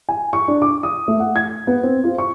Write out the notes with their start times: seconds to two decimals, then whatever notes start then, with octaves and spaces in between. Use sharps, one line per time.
0.09 G#5
0.33 C#6
0.48 D4
0.62 D6
0.83 D#6
1.08 A3
1.20 F#5
1.36 G#6
1.67 B3
1.83 C4
2.04 F4
2.18 C#6